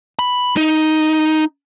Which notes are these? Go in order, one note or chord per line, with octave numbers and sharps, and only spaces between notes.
B5
D#4